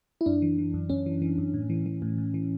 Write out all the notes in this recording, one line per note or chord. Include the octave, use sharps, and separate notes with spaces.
E4
F#2 D4
E3
E3
F#2
F#2 C#4
E3
E3
F#2
A2
E3
E3
A2
A2
E3